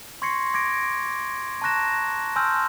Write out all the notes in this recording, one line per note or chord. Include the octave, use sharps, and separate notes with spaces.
C6 C#6 G#6 A#6 C7 C#7
D6 G#6 A#6 D7
A5 A#5 C#6 F#6 A#6 E7
G#5 A5 C6 E6 F6 G6